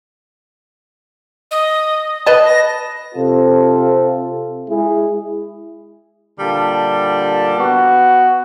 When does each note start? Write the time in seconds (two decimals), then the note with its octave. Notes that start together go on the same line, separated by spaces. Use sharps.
1.51 D#5
2.26 B4 D#5 A5
2.46 A#6
3.15 C3 C4 F4 A4
4.70 G#3 E4 G#4
6.39 A#2 D3 G3 A5
7.58 B3 F#4